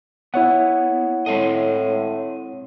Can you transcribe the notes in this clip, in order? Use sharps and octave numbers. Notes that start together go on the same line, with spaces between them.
B3 E4 C#5 F#5
A2 G#3 C4 D#5